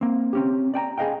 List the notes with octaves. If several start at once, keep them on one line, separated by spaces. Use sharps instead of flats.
A#3 C4
C4 C#4 G4
D5 G5 G#5 A#5
G#4 B4 D#5 F5 G5